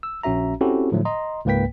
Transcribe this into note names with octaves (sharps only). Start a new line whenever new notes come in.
E6
A#1 C#4 F#4 E5 A#5
C4 C#4 E4 F#4 G4 A4
A2 D3 F3 F#3 A3
D#5 A#5 C6
C#2 G#2 A#3 B4 G5 B6